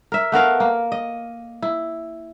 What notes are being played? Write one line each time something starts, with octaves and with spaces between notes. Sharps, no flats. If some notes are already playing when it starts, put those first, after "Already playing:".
A#4 E5
A3 B3 A#4 F5
A#3
D#5
E4